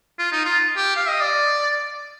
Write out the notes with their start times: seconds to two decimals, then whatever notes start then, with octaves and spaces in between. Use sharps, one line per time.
0.19 F4
0.32 D#4
0.45 F4
0.76 G4
0.96 F5
1.08 D#5
1.21 D5